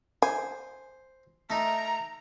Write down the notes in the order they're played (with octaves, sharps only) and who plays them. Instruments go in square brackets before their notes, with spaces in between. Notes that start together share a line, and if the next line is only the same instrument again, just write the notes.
[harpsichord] C5 [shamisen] G#5
[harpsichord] A3 D#4 [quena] A#5